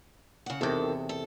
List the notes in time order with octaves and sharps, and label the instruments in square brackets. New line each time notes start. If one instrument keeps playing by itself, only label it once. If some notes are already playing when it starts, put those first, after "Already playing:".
[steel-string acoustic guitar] C#3 F#5
[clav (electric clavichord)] E2 C3 [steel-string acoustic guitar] D#3 A4
[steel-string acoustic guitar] A4